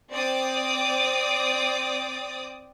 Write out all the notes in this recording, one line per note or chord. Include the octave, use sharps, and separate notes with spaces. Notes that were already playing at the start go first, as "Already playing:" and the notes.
C4 D5 D6 D#6